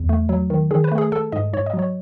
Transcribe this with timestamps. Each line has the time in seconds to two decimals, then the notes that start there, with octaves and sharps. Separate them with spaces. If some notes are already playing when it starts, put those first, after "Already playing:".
Already playing: E2
0.09 A3
0.29 F#3
0.50 D#3
0.71 D#3 G#4
0.84 B4
0.92 A3
0.98 G#4
1.12 A3 A4
1.32 G#2 D#5
1.53 G#2 C#5
1.66 D#5
1.73 F#3
1.79 C#5